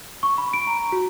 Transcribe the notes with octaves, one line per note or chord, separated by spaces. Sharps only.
C#6
B5
D7
A#5
F#4